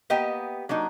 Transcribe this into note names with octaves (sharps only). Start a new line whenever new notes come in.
A#3 B3 G4 D#5 G5
F#3 A#3 D4 D#4